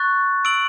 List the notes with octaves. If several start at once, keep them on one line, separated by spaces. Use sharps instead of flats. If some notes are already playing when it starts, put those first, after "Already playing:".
Already playing: C#6 F#6 A6
E6 A6 D7 F#7